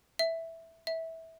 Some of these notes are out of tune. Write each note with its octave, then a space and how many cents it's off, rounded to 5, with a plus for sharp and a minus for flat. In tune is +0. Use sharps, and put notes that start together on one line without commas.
E5 -5
E5 -20